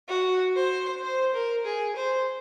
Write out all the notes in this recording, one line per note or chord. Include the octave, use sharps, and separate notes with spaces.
F#4
C5
C5
A#4
G#4
C5